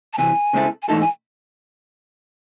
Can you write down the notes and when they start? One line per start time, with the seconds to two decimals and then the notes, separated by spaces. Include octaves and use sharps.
0.13 A5
0.18 C2 C3 E3 G#5
0.53 C#3 G#3 C4 E4 A4
0.82 G#5
0.89 G#2 E3 A3 D#4 A4 A5
1.01 G#5